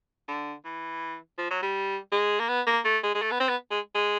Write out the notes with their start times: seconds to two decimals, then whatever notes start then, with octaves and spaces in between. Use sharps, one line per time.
0.28 D3
0.65 E3
1.38 F3
1.51 F#3
1.63 G3
2.12 G#3
2.40 A#3
2.48 B3
2.67 A#3
2.85 A3
3.03 G#3
3.15 G#3
3.22 A3
3.31 B3
3.40 C4
3.49 B3
3.71 G#3
3.95 G#3